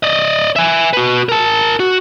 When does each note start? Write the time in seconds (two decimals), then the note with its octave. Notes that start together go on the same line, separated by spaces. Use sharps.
0.03 D5 D#5
0.56 E5 G#5
0.93 F#4 B4
1.29 A#4 A5
1.79 F#4